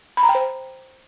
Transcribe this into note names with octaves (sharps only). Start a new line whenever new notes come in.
B5
A#5
G5
C5